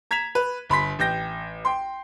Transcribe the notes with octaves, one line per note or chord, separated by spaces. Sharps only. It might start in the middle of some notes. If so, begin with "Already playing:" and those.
A#5 G#6 B6 E7 F7
B4
G1 B5 C6 B6
A1 G5 G6 A#6
G5 C6